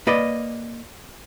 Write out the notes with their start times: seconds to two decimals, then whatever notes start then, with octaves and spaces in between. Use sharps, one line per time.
0.07 A#3 B4 D5 D#5